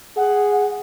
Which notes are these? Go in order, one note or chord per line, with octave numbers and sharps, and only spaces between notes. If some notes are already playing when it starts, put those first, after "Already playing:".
G#4 F#5